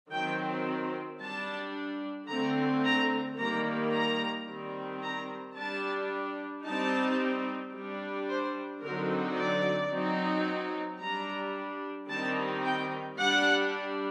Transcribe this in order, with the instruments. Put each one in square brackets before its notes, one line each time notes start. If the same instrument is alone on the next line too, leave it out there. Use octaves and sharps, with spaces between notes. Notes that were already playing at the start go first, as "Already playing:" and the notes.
[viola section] D#3 F#3 C4 G5
G3 D4 A5
D3 A3 C4 A#5
A#5
D#3 G3 A#3 A#5
A#5
D#3 G3 C4
A#5
G3 D4 A5
G3 C4 D#4 A5
G3 D4
C5
D3 F#3 C4 D#4 A#4
D5
F#3 C4 D#4
G3 D4 A#5
D#3 G3 C4 D#4 A5
G5
G3 D4 F#5